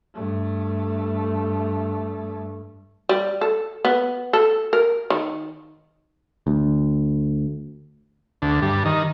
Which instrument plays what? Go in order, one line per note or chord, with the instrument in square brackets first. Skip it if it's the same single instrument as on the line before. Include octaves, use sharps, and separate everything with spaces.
[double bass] G2 A3
[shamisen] G3
A4
B3
A4
A#4
D#3
[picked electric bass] D2
[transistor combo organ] D2
G2
D#3